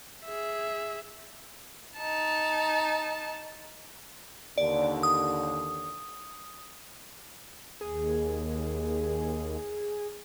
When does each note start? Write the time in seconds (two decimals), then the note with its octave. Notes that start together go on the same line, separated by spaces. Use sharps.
0.24 G#4 E5
1.98 D#4 A5
4.58 D#2 D3 D5
5.03 D#6
7.81 D#2 G#4